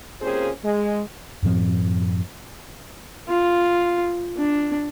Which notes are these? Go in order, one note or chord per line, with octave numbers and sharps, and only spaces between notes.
C3 A#3 C#4 F4 G#4 C5
G#3
F#2 A2 F3 C4
F4
D4